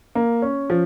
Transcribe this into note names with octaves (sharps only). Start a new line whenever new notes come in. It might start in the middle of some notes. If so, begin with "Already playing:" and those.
A#3
C#4
F3